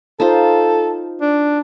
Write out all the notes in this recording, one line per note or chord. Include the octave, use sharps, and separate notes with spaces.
D#4 F4 A4 C5
D4